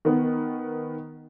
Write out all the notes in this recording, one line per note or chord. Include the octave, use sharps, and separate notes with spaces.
D#3 B3